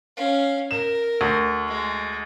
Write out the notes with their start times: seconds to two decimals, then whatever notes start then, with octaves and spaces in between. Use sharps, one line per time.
0.17 C#4 F5
0.71 A#4 E7
1.21 D2
1.68 G#3